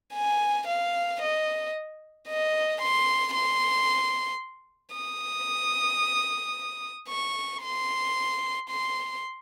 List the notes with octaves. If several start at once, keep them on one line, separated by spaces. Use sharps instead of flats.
G#5
F5
D#5
D#5
C6
C6
D#6
C#6
C6
C6